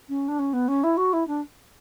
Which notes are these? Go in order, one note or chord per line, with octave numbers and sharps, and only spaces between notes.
C#4
D4
C#4
B3
C#4
E4
F#4
E4
D4